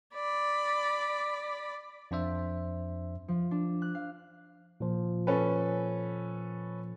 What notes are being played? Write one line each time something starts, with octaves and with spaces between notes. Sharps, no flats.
D5 B5
F2 D4 C5 E5
F3
D4
F#6
F5
A#2 F3
C#4 A4 B4